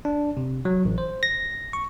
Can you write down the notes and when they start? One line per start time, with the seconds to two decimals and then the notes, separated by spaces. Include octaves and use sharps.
0.05 D4
0.37 C3
0.65 F#3
0.85 A1
0.98 C5
1.23 A#6
1.73 C#6